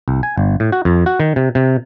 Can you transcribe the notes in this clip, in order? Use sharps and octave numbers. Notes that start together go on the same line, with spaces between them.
C2
G#5
G1
A2
F#4
F2
F#4
D#3
C3
C3